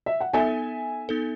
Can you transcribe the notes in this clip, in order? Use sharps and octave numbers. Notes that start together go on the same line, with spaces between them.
E5
F#5
B3 D#4 A4 E5 G#5
B3 D#4 A4